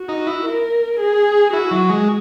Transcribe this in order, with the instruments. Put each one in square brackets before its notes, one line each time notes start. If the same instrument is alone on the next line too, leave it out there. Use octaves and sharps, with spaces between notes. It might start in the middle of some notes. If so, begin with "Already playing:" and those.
Already playing: [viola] F#4
[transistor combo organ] D#4
E4
[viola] A#4
G#4
[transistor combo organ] E4 [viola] F#4
[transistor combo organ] F#3
G#3